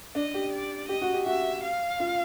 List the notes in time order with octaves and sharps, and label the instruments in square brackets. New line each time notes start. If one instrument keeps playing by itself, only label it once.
[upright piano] D4 [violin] D#5
[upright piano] G4
[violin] D5
[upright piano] G4 [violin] D#5
[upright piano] F#4
G4
[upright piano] F#4 [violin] E5
[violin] F5
[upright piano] F4